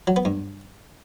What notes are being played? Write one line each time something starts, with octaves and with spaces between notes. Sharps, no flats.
F#3
B3
G2